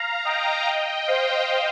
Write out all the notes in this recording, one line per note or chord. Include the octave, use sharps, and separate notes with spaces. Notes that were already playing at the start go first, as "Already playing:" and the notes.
Already playing: F5 A#5
D#5 G5
C5 F5